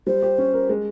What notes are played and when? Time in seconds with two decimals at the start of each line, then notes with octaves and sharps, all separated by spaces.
0.07 G3 C5
0.22 G4
0.38 C#4
0.53 A#4
0.69 G#3